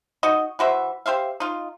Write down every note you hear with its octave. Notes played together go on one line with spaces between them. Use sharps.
D#4 F#4 D#5
E3 F#4 C5 E5
G4 C5 E5 F5
D#4 F4